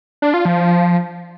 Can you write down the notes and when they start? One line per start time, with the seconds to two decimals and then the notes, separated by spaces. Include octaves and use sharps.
0.22 D4
0.34 F4
0.45 F3